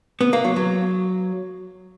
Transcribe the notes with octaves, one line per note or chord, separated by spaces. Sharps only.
B3
A#3
F#3
F#3